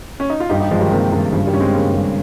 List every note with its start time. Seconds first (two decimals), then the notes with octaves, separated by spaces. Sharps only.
0.20 C#4
0.30 D#4
0.40 F4
0.49 G2 D#4 G4
0.60 D#4 G4
0.71 G2 F3 G#3
0.81 D#3 G3
0.91 C3 D#3 A#3
1.12 G2 C3 D#3
1.33 G2 C#3 F3
1.46 D#3 G3
1.53 G2 C#4
1.60 G#3 C4
1.73 C#3 A#3
1.94 G2